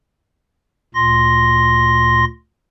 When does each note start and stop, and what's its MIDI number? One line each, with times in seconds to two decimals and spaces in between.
0.95 2.25 38
0.95 2.25 46
0.95 2.25 84
0.95 2.25 94